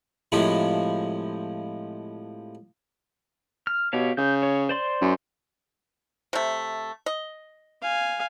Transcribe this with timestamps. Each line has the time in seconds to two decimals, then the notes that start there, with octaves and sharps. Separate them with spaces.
0.32 A2 C3 F3 G#3 G#4 B5
3.67 F6
3.93 B2 G4 C#5 F5
4.17 C#3 G6
4.43 C#5
4.69 C5 D5 C6
5.01 F#2
6.33 C3 A3
7.06 D#5
7.82 F5 G#5